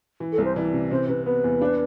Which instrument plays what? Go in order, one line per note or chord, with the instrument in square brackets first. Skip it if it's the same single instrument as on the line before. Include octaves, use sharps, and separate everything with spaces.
[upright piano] E3
[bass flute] A4
[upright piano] C2
[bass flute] C5
[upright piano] E3 [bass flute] D5
[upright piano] C3
[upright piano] C3 [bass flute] C5
[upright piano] C3 [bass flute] B4
[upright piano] B3 [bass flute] B4
[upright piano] E2
D4